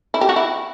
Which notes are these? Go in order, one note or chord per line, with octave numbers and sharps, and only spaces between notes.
E4
G4
F#4
E4